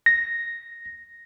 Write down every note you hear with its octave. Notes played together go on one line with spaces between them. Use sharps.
A#6